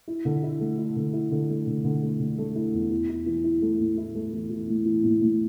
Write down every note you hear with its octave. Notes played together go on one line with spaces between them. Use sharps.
E4
D3
E4
A3
E4
D3
E4
D3
A3
D3
D3
A3
D3
A3
E4
E2
E3
E4
E3
E4
A3
A2
E4
A3
E3
E3
A2
E3
A2
A2